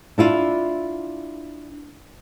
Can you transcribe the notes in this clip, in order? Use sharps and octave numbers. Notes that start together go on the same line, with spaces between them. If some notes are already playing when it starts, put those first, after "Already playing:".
D4 E4 F4